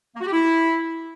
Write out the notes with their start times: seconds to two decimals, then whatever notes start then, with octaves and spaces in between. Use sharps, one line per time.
0.15 A#3
0.21 F#4
0.27 G4
0.33 E4